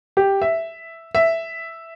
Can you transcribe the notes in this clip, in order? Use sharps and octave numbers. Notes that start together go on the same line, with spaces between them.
G4
E5
E5